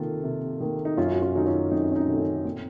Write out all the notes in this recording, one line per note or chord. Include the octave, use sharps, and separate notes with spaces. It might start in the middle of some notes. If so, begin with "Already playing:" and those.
Already playing: C3 D#3 A#3 F4 A4
C3
D#3 A#3
D#4
F#2 C#4 F4
F#4
C#4 F4
D#3 F#3 A3 D#4
C#4 F4
F#2 C4 D#4
C#4
C4 D#4
D#3 F#3 A3
C#4
A#2 C4